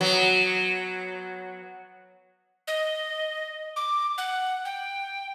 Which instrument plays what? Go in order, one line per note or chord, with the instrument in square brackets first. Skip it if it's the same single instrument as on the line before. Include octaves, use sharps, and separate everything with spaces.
[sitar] F#3 B3
[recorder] D#5
D6
F#5
G5